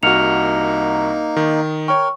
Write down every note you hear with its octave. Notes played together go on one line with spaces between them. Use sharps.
C2 A#3 D#4 F#4 F6 C#7 F7
D#3
A#4 C#5 G5 C#6